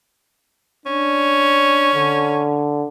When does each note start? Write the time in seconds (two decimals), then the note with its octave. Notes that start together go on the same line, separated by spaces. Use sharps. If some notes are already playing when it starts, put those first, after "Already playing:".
0.86 C#4 D4
1.94 D3